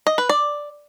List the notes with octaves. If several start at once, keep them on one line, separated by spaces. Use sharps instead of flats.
D#5
B4
D5